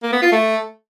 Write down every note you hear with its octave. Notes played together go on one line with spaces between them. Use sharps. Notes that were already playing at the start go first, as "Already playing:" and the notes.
A#3
B3
F4
A3